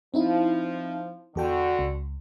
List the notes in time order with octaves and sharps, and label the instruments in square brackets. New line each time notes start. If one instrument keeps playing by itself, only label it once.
[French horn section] F3 [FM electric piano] C4 D#4 E4
[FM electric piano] E2 A4 G5 [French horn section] D3 F#4
[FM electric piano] C#2